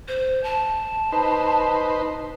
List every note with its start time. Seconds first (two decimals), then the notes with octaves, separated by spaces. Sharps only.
0.08 C5
0.43 A5
1.12 D#4 B4 C5